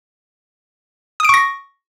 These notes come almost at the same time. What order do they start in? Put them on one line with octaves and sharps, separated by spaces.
D#6 D7 C#6 A#6